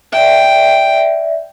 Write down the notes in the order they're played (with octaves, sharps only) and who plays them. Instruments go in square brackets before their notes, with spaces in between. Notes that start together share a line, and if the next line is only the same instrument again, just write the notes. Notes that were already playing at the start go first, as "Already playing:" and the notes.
[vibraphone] D5 E5 [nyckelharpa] G5